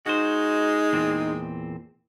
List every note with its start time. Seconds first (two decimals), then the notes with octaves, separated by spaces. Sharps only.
0.06 G#3 D#4 F#4 C5
0.93 E2 A#2 C4